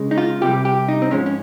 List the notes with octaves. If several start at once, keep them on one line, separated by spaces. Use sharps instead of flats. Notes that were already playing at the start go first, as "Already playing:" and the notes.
Already playing: C#2 C#3 G#3
D#4
F4
C2 C3 G3 G4
G4
D#4
C4
G#2 F3 G#3 C#4
C#4